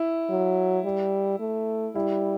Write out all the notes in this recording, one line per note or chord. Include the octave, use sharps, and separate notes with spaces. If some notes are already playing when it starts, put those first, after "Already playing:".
Already playing: E4
F#3
G3
A3
G3 E4